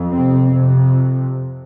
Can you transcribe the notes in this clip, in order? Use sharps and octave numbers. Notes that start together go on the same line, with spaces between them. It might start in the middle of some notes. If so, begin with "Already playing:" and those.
Already playing: F2
C3 C4
F2 C3